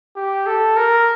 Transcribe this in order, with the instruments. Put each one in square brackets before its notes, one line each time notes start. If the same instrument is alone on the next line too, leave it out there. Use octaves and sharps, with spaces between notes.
[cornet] G4
A4
A#4